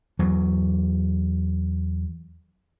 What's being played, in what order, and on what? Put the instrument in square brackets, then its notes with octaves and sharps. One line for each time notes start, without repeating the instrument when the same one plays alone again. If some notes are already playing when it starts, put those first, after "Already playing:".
[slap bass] E2 F#3